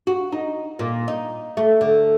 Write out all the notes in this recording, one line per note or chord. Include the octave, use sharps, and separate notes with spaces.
F#4
D#4
A#2
D#4
A3
D3